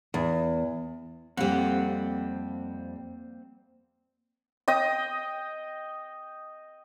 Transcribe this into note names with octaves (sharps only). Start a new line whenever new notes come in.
E2
F2 G3 A#3 C4 F#5
D#5 G5 D#6